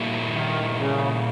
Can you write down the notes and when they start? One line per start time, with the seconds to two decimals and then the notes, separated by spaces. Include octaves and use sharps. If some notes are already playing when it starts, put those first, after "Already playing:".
Already playing: A#2 G3 A#3 E4
0.34 D#3
0.78 C#3